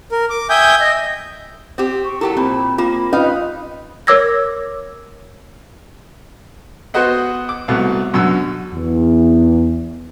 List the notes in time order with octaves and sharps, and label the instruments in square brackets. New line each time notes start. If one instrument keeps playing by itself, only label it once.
[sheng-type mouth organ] A#4
D6
E5 G5 G#5 D#6 G6
D#5
[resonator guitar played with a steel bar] C4 G4
[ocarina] C#6
[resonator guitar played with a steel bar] F#3 G4 A4 [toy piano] E4 [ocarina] A#4
[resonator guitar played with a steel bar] A#2 [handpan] C4 [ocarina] B5
[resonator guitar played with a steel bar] A#3 [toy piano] F4 [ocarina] B5
[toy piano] C#4 [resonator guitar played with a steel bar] D#4 D#5 F5 [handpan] F4 B4
[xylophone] A#4 C#5 D6 E6 G#6 A#6
[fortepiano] B3 F#4 B4 C5 D#5 F#5
D6
C2 B2 A3
F#2 B2 D3 E6
[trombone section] E2